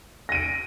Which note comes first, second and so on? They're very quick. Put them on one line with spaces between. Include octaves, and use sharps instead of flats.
A#6 D#7 D7